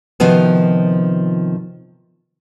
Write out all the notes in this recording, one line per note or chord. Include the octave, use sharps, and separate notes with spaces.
C3 D#3 F3 B3 F4 F#4